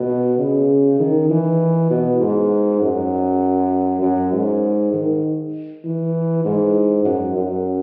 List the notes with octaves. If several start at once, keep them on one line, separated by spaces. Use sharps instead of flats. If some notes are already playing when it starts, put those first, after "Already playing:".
Already playing: B2
C#3
D#3
E3
B2
G#2
F#2
F#2
G#2
D#3
E3
G#2
F#2
F#2